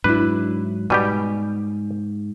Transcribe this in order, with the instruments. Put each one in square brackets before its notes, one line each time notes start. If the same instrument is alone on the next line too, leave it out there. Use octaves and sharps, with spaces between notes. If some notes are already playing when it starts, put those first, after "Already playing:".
[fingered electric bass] G#2 F#3 [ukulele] D4 E4 [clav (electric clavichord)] B4
[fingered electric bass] G#2 [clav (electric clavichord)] B2 G3 G4 [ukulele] G#5